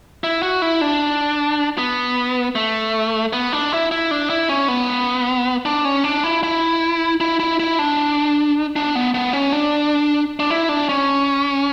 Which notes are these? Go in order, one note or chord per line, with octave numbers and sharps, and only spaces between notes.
E4
F#4
E4
D4
B3
A3
B3
D4
E4
E4
D4
E4
C#4
B3
D4
C#4
D4
E4
E4
E4
E4
E4
D4
D4
B3
B3
C#4
D4
D4
E4
D4
C#4